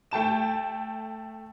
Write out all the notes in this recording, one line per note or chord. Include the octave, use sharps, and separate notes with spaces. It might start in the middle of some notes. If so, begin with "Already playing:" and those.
A3 G5 A5 E7